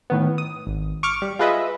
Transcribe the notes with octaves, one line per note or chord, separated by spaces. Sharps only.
A2 D#3 B3
D#6
G#1
C#6 D6 F6
G3
F4 G#4 B4 D#5 E5